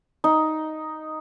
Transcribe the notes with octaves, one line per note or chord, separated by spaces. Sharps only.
D#4